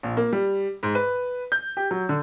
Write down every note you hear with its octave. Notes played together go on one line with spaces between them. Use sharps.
A#1
A#3
G3
G#2
B4
G6
G4
F#3
D3